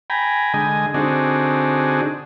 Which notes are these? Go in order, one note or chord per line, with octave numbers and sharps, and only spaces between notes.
G5 G#5 A#5 B5
D3 G#3 D#5 G#5
D3 C4 D4 D#4 F#4 G#4